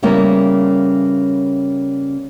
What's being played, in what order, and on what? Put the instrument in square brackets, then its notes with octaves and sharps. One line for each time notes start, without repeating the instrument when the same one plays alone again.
[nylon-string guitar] C#3 G3 A#3 B3 C#4 E4